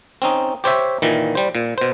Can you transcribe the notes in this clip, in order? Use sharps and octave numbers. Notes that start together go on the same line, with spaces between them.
C4 C#4 D#4
G4 C5 C#5 E5
A#2 D#3 E3
G3 C5
A#2
B2 C5